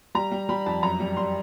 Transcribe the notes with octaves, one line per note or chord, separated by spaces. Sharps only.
G3 A#5
G3
G3 B5
F2 A5
F#2 A#5
G3
G3 C6